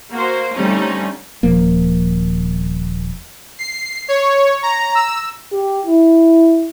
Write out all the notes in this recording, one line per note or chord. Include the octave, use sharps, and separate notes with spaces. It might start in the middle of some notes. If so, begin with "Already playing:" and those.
A#3 F#4 C5
D3 G3 A3 C4 C#4 D#4
D#1 F3 A#3
C7
C#5
A#5
E6
G4
E4